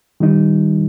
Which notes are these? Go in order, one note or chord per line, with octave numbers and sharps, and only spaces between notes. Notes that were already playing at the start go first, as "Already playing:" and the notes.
D#3 G3 D#4